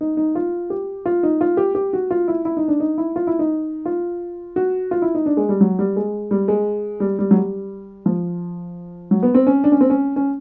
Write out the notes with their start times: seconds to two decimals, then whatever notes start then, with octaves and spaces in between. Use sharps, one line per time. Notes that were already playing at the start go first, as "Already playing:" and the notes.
0.01 D#4
0.17 D#4
0.35 F4
0.70 G4
1.06 F4
1.23 D#4
1.41 F4
1.57 G4
1.75 G4
1.93 F#4
2.11 F4
2.28 E4
2.45 E4
2.57 D#4
2.68 D4
2.80 D#4
2.98 E4
3.16 F4
3.27 E4
3.39 D#4
3.86 F4
4.56 F#4
4.91 F4
5.02 E4
5.15 D#4
5.26 D4
5.37 G#3
5.49 G3
5.61 F#3
5.79 G3
5.96 G#3
6.31 G3
6.48 G#3
7.00 G3
7.19 G3
7.31 F#3
7.36 G3
8.06 F3
9.11 F#3
9.23 B3
9.35 C4
9.47 C#4
9.64 D4
9.72 C#4
9.81 C4
9.90 C#4
10.16 C#4